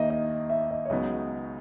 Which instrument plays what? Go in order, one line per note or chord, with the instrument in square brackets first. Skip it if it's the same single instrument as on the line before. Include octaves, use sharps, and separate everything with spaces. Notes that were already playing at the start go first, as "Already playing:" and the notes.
Already playing: [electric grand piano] D#2 D#3 A#3 D#4 [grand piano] D#5 E5
[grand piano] D#5
E5
D#5
C#5
[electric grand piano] C#2 C#3 F#3 B3 D#4 [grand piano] D#5